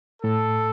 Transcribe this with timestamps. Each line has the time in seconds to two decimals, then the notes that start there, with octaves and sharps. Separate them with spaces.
0.23 A2 A4